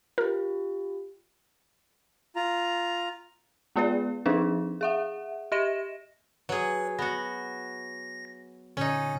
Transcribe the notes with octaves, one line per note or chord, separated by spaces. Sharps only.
F4 G4 A#4
F4 A#5
G#3 B3 F4 G#4 B4 D5
F3 C4 D4 D#4 G#4
G#4 E5 F#5
G4 D#5 E5 A#6 E7
F#3 G#4 B4
B3 F#4 A#6
A#2 D3 C#4 D#4